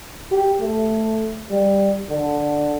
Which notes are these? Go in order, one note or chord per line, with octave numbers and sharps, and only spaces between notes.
G4
A3
G3
D3